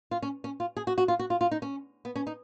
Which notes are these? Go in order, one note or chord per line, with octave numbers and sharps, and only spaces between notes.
F4
C#4
C#4
F4
G#4
F#4
F#4
F4
F#4
F4
F4
D#4
C#4
B3
C#4
D#4